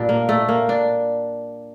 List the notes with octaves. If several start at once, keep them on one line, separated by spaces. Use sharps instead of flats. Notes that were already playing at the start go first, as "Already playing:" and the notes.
Already playing: A#2 G3 D4
A#3
A3
A#3
D4